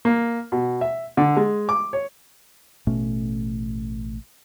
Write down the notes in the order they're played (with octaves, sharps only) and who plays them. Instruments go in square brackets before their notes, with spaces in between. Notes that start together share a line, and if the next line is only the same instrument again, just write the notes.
[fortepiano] A#3
B2
E5
D3
G#3
D6
C#5
[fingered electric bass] A1 B2 A3 C#4